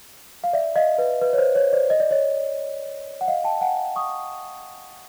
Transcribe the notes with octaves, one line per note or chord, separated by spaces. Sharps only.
F5
D5 E5
D#5 F5
B4
B4
C#5
C5
C#5
C5 D5
D#5
D5
C#5 D#5
F#5
D#5 F5
G5 A5
F#5 G#5
C#6 D#6